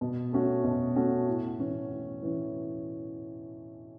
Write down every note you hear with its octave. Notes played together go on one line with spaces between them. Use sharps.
B2
A3 C#4 F#4
B2
A3 C#4 F#4
A2
E3 C#4
A2
E3 C#4